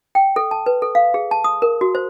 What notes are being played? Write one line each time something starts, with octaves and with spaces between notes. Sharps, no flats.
G5
A4
A5
B4
A4
F5
G#4
A5
D#6
A#4
F#4
C5